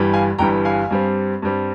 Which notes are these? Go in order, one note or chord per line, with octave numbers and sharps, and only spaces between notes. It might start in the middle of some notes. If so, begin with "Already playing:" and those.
Already playing: G1 G2 E3 G3
F5 G#5
G1 G2 E3 G3 G5 A#5
F5 G#5
G2 G3 C4
G2 G3 C4